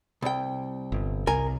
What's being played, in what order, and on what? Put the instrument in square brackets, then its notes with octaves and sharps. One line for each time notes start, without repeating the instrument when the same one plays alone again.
[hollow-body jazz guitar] C2 G5
[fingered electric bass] G1
[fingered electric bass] C2 [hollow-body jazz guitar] A#4 G#5